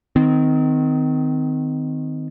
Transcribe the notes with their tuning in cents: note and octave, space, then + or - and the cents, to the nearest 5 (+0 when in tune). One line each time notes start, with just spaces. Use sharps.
D#3 +0 C4 -30